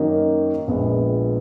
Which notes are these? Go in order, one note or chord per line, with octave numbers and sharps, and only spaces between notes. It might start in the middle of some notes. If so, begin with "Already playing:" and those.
Already playing: F#2 D#3 A#3 D#4
A#1 A#2 G#3 B3